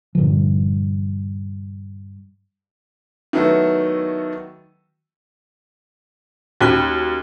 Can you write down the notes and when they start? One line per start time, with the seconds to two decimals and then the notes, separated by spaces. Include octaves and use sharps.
0.15 G2 A#2 D3 F3
3.33 D#3 F#3 A3 B3 E4 F#4
6.61 D#2 C#4 F#4 F#6